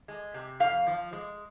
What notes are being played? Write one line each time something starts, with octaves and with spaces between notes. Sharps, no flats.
G#3
C3
F2 F5
F3
G#3